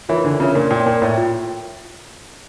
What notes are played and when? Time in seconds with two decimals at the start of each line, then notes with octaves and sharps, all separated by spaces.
0.09 E3 F4 A#4 C#5 E5
0.24 D3 D4
0.40 C#3 F4 A#4 C#5 E5
0.55 A#2 A#4
0.70 A#2 C#5 G5
0.86 A#2 A#4
1.02 A2 C#5 G5
1.18 F4